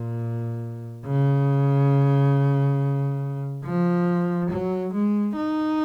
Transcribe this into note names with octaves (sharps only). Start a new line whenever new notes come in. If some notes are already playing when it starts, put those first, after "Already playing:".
Already playing: A#2
C#3
F3
F#3
G#3
D#4